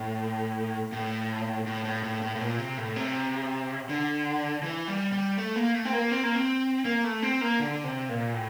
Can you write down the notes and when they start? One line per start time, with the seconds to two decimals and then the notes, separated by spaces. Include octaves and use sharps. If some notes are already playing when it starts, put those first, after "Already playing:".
Already playing: A2
0.92 A2
1.67 A2
1.85 A2
2.03 A2
2.21 A2
2.35 A2
2.41 A#2
2.59 C3
2.78 A2
2.96 C3
3.89 D3
4.63 E3
4.88 G3
5.12 G3
5.38 A3
5.56 A#3
5.74 A3
5.85 C4
5.93 A#3
6.11 C4
6.23 A#3
6.35 C4
6.85 A#3
7.04 A3
7.22 C4
7.41 A#3
7.60 D3
7.84 C3
8.09 A#2
8.34 A2